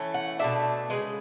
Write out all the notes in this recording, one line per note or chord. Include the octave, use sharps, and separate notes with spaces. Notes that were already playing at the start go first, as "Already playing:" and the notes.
Already playing: E3 A3 C#4
F#5
B2 A3 D4 E5
C#3 E3 G#3 B4